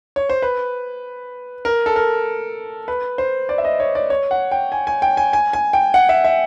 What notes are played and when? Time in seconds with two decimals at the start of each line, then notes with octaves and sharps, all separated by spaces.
0.16 C#5
0.30 C5
0.42 B4
1.65 A#4
1.86 A4
1.96 A#4
2.88 B4
3.18 C5
3.49 D5
3.58 E5
3.64 D#5
3.80 C#5
3.95 D5
4.10 C#5
4.31 F#5
4.51 G5
4.72 G#5
4.87 G#5
5.02 G5
5.17 G#5
5.33 G#5
5.53 G#5
5.73 G5
5.94 F#5
6.09 E5
6.24 E5